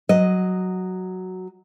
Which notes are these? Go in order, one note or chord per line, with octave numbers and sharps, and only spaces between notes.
F#3 D#5